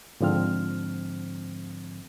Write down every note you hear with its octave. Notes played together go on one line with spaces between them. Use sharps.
G#2 D3 F3 C4 F6